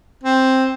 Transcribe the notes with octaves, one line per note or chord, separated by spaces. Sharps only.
C4